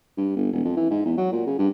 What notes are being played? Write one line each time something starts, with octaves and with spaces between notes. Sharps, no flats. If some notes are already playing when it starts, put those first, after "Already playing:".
G2
G1
E1
F2
E3
G#2
E2
F#3
A#2
C#3
G2